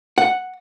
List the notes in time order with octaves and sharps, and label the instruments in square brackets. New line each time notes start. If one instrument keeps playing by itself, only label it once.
[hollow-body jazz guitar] F#5